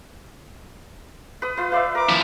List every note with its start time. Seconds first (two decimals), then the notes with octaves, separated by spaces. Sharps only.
1.42 B4 D#6
1.57 F4 B4
1.72 B4 D5 E5 F5
1.95 A#4 D6
2.09 F3 E4